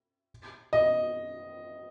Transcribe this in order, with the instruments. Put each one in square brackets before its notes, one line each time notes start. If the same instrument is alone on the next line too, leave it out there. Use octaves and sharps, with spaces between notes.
[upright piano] D#5